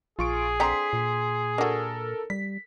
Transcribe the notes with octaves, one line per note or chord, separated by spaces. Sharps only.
A#1 F4 G#4 C#6 D7
D3 C4 A#5 C6 B6
A#2
D4 F#4 A4 A#4
G3 B6